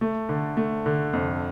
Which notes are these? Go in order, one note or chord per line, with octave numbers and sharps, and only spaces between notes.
A3
D3
A3
D3
F2